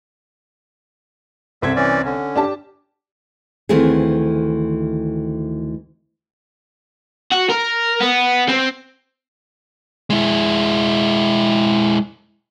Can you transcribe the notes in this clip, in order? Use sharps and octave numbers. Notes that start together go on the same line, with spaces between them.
C2 C4 A4 E5 G#6
E3 C#4 D5
D3 C#4
D4 G4 A5
D2 D#3 E3 A3 C4 G#4
F#4
A#4
B3
C4
G#3 E4